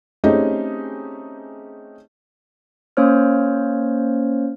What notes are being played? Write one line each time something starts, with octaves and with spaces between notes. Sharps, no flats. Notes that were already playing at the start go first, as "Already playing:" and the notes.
A3 C4 C#4 D#4 G4 G#4
A#3 C#4 C5 C#5 F6